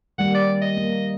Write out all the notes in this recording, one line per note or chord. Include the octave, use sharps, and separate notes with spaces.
D#3 G3 A#3 F#5
D5
D#5
A#3